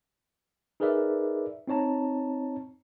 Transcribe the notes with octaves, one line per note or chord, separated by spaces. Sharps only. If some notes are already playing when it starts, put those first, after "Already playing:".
D#4 G#4 A#4 B4 D5 E5
C4 D#4 C#5 A5 A#5